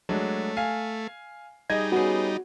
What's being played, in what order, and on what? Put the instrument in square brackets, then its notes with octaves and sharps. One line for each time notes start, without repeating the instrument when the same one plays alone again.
[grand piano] F#3 G#3 D4 [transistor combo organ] A3
[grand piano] F5 G#5
[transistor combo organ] G3 D#4 [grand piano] G#4 D#5 [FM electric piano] G#6
[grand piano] B3 C#4 G#4 [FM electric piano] F#4